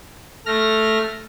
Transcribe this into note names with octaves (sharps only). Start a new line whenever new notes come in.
A3 F6 A#6